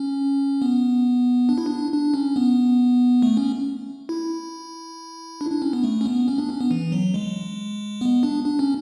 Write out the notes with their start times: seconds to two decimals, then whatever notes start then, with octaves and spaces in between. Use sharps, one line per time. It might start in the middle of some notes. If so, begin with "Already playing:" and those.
Already playing: C#4
0.62 B3
1.49 D4
1.58 E4
1.66 D4
1.93 D4
2.14 C#4
2.36 B3
3.22 A3
3.37 C#4
4.09 E4
5.41 D4
5.52 D4
5.62 C#4
5.73 B3
5.84 A3
6.01 C#4
6.05 B3
6.28 C#4
6.38 D4
6.49 C#4
6.61 B3
6.71 E3
6.92 F#3
7.14 G#3
8.01 B3
8.23 D4
8.44 D4
8.59 C#4